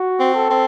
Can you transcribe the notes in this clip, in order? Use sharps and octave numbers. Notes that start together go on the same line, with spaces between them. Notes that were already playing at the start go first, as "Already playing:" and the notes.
Already playing: F#4
C4
A4
C4